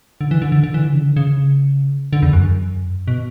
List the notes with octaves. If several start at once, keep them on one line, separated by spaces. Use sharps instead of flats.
D3
E3
D3
D3
D3
E3
D3
C#3
D3
C#3
D3
E2
F#2
B2